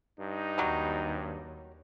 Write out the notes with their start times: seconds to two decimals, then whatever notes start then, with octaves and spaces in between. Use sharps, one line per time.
0.19 G2 D#4
0.58 D#2 F#3 G3